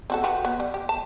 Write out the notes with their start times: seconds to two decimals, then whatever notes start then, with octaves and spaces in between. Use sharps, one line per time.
0.10 C4 F#4 A4
0.24 F#4 G4 B4
0.45 B3
0.60 G3
0.74 G4
0.89 A5